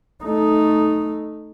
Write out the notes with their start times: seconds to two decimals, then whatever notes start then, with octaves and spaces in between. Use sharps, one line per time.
0.23 A3 D#4